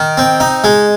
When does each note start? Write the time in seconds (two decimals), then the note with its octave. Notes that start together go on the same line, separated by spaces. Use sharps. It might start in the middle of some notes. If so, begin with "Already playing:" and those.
Already playing: D#3
0.17 C4
0.40 D#4
0.64 G#3